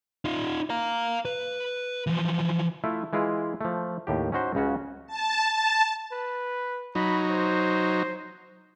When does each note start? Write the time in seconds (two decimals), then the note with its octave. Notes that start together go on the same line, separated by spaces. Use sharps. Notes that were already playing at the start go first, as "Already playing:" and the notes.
0.25 D#4 F4
0.70 F5 A#5
1.25 B4
2.07 E3 F3
2.84 A3 E4 F4
3.13 E3 G#3 E4 F4
3.61 F3 A3
4.07 D#2 A2 G4
4.32 C#4 D#4 F#4 C5
4.55 C#2 C#3 C#4 F#4
5.07 A5
5.51 A5
6.12 B4
6.95 F#3 D#4 B5
7.30 C5